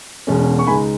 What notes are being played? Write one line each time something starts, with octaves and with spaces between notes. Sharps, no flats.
E1 E2 B2 G#3 C#4
C#6
C#2 C#3 G#3 D#4 G#5 B5